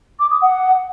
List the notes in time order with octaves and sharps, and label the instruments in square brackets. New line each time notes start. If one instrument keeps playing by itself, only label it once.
[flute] D6
D#6
F#5